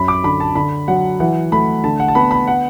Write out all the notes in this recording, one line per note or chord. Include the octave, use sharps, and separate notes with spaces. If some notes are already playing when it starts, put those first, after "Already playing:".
Already playing: F#2 B5
D6
D3 B5
A5
D3 B5
F#3 F#5
E3 F#5
A3 B5
D3 A5
F#5
A5
B3 B5
B5
F#5